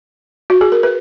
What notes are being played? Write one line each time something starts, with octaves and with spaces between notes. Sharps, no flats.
F#4
G#4
A#4
B4